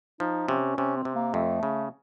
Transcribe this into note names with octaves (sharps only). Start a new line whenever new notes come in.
F3 D#4
C3 C#4
C3 C#4
C4
C3
A#3
F2 A3
C#3